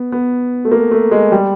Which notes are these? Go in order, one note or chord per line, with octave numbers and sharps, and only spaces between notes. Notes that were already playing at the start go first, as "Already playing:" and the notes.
Already playing: B3
B3
A3
A#3
A3
G#3
G3